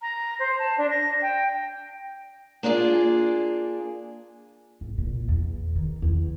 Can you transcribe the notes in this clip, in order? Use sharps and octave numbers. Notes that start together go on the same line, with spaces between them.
A#5
C5
A5
D4
A#6
G5
A#3 D4 F4 G#4
G#1
A#2
E2
D#3
E2